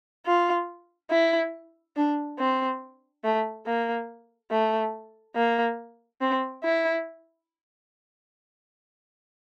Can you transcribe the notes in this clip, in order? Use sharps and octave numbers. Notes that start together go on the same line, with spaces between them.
F4
E4
D4
C4
A3
A#3
A3
A#3
C4
E4